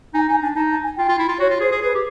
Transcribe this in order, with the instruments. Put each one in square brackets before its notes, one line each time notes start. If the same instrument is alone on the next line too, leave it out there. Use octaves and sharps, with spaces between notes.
[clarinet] D#4 [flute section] G#5
[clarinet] D#4 [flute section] G#5
[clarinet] D4 [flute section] G#5
[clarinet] D#4 [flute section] A5
[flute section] A5
G#5
[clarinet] F4 [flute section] G5
[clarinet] F4
E4
F4
[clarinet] F#4 [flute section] C#5
[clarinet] F4
[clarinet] G#4 [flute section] C5
[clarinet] G#4
[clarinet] G#4 [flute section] B4
[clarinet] G4